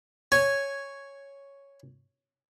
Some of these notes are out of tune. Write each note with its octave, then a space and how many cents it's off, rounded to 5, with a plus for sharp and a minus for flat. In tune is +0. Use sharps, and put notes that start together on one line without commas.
C#5 +0 G#5 +0